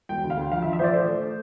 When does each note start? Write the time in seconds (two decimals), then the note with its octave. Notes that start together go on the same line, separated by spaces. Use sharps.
0.09 E1 G5
0.23 D2
0.30 F5
0.37 D2
0.51 F3 F5
0.62 E5
0.66 F3
0.73 E5
0.79 A#1 C5 D5
0.93 A3 C5
1.08 A3